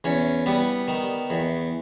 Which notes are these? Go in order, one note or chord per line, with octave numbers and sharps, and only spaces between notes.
E2 C#4
G3 B3
D#3
E2